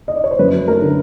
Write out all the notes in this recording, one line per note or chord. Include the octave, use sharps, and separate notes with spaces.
D#5
D5
C#5
C5
F#2 B4
F#3
A3 A#4
D3